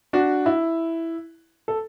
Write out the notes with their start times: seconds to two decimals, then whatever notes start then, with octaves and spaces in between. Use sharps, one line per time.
0.13 D4 F#4
0.46 E4
1.68 A4